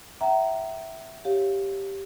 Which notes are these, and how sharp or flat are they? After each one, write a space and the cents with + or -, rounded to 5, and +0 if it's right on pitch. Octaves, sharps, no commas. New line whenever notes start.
E5 +0 G5 -45 A#5 +0
G4 +0 C#5 +0 F5 +15